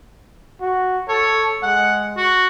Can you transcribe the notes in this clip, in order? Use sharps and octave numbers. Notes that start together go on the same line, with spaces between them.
F#4
A4 C#5
G#3 F#5
F#4